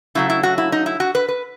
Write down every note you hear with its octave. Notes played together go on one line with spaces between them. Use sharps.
C#3 F#3 A3 E4
E4
F#4
E4
D#4
E4
F#4
B4
B4